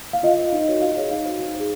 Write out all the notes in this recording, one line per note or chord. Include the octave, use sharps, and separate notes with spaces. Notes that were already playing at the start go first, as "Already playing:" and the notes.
F5
F4 D#5
C5
D#4
F#4 A#4 C#5
F4 F5
G#4 C#5
D#4 F5
F#4 C5
D#4
G#4 C5